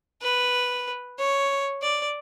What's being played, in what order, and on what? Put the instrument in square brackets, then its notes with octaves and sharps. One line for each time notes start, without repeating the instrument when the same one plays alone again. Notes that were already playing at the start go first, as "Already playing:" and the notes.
[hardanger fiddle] B4
C#5
D5